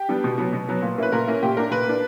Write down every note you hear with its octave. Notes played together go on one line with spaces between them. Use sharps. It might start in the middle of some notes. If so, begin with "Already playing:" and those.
Already playing: G4
G3 B3 D4
B2
F#3 B3
B2
F#3 B3
A#2
A#3 C#4 E4 B4
A#2 A#4
A#3 C#4 E4
A#2 G4
A#3 D4 A#4
A#2 B4
A#3 D4